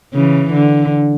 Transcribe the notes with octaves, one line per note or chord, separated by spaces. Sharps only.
C#3 E3
D3